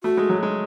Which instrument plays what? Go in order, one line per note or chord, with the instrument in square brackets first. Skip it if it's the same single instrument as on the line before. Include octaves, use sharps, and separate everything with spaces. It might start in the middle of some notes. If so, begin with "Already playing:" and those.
[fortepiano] A3 [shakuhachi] F#4
[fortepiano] G#3
F#3
G#3